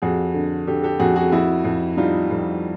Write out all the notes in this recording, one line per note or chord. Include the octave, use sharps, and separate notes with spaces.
F2 F#4 G#4
D3
D3 G4 A4
G4 A4
F2 F#4 G#4
F#4 G#4
F2 E4 F#4
F2
G3 D#4 F4
F2